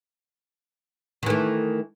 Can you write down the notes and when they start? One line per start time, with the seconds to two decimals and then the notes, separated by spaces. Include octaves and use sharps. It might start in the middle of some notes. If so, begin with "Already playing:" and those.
1.23 D#3
1.26 E3
1.30 A3